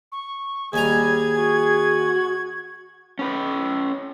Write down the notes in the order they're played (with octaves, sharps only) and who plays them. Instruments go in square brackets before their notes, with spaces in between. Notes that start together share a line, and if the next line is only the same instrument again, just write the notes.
[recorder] C#6
[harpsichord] D#2 G#5 A#5 [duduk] G3 [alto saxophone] G#4 [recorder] G#6
[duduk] F#4
[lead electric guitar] C#4 B4